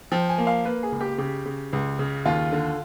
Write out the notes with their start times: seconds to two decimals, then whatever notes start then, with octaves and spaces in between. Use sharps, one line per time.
0.12 F3 G5
0.29 G#5
0.38 A#3
0.47 F5
0.65 A#3 B4
0.83 G#4
0.92 C#2
1.01 G4
1.18 C#3 G4
1.46 C#3
1.73 C#2
1.99 C#3
2.25 D#2 F4
2.52 D3